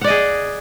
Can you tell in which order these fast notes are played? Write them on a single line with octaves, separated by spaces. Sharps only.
F#5 D5 D#5 G#4